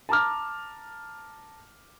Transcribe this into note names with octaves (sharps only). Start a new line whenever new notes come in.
A5 A#5 D6 F6